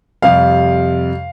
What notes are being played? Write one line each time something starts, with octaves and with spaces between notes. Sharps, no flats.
F2 C3 G3 F5